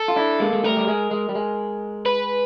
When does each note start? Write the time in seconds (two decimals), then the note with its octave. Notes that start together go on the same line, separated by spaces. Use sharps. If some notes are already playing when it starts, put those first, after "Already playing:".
Already playing: A4
0.08 F4
0.16 D4 E4
0.40 G#3 A#3
0.53 G#3
0.64 G3 A3 A#4
0.77 G3
0.88 G#3
1.11 G#3
1.29 G3
1.35 G#3
2.06 B4